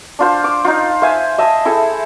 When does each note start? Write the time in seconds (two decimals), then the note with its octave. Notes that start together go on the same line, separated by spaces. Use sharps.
0.19 D4 F4 C5
0.44 D6
0.65 D#4 F4
1.02 C5 E5 F5 G#5
1.38 D#5 E5 A5
1.65 E4 G#4 A4